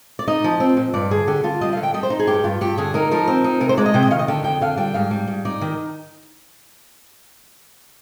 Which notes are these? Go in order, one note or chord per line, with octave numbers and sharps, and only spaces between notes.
D5
D#4 D#5
F3
C4
A#2
G2 D5
D3 G#4
D3 G4
D3 F4
G3 D#5
D3 F5
G5
G3 D#5
C5
D#4
G#4
G2 G4
G2 F4
G2 G4
D3 G#4
D#4 A#4
F3 A#4
C4
D#4
C3 A#4
C5
G#3 D5
D#5
C3 G5
D#5
D#3 F5
D#5
D3 G5
F2 G5
D3 F5
G3 G5
G#2 F5
G3
G#2
D#4 D5
D#3